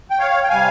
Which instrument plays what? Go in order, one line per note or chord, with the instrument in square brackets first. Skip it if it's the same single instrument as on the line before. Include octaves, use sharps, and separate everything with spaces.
[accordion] G5
C#5 F5
G5
C3 G3 F5 G#5